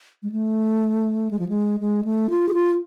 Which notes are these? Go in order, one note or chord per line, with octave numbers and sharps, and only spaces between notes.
G#3
A3
G#3
F3
G#3
G#3
A3
F4
G#4
F4